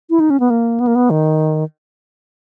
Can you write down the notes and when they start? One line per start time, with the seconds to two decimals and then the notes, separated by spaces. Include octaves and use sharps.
0.10 E4
0.20 D#4
0.30 C#4
0.40 B3
0.50 A#3
0.80 B3
0.87 A#3
0.95 B3
1.10 D#3